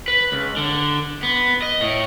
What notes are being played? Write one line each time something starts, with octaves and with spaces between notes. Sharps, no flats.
B4
C#2
D3
B3
D#5
A2